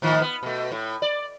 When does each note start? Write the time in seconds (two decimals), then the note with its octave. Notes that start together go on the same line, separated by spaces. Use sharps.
0.02 A2 D#3 F3
0.21 B3
0.43 B2 A3
0.72 A2
1.02 D5